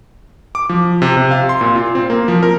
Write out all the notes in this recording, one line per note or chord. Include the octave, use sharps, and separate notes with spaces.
D6
F3
C3
C3
F5
C6
A#2
F4
C4
A#3
F3
A#4